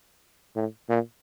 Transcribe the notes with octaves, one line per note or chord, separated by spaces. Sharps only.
A2
A#2